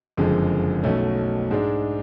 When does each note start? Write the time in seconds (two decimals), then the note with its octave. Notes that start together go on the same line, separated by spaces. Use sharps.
0.17 F#1 F2 D3 F3 G#3
0.83 B1 B2 A3 C#4
1.51 G#2 G#3 D4